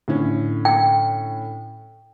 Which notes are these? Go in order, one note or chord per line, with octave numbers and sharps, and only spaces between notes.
A2 D3 C#4
G5